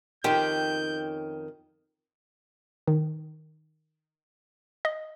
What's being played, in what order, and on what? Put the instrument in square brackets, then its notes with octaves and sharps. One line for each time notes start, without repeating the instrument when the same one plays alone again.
[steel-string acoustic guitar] F2 D#3 [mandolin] C#4 G5 C6 [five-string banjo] G4 [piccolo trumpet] G6
[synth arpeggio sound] D#3
D#5